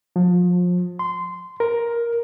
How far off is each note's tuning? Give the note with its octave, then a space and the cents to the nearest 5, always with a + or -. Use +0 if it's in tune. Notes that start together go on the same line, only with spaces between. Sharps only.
F3 +30
C6 -15
A#4 +10